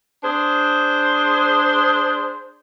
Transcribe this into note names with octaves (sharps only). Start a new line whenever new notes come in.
D4 G#4 C5